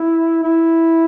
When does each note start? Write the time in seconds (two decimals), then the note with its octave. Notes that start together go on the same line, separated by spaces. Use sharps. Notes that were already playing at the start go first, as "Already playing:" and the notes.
Already playing: E4
0.43 E4